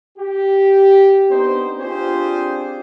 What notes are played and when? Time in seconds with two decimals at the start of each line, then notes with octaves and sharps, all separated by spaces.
0.18 G4
1.30 B3 C4 D4 D#4 C5
1.80 C4 D4 F4 G4 G#4 C5